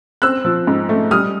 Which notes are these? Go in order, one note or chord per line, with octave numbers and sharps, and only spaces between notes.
C4 E6 F#6
F3
G#2
A3
G3 D#6 F6